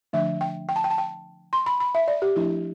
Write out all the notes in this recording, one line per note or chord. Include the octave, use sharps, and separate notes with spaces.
D3 F3 A3 D4 E5
G5
G5
A5
G5
A5
G5
C6
B5
B5
E5
D5
G4
F3 A3 D4 E4